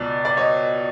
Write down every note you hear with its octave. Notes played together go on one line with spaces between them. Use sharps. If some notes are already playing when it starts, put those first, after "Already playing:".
Already playing: C#2 B2 D5
D5
C#5 D#5